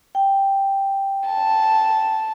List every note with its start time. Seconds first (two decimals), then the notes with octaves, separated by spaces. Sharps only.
0.15 G5
1.29 A5